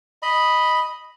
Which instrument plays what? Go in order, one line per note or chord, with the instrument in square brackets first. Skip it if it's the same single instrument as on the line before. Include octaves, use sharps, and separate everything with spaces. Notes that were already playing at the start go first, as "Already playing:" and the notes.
[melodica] D#5 B5